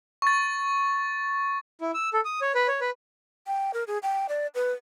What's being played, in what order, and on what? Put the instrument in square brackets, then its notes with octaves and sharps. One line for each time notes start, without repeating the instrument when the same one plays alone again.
[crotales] C#6 A6
[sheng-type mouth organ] E4
E6
A4
D#6
C#5
B4
C#5
B4
[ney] G5
A#4
G#4
G5
D5
B4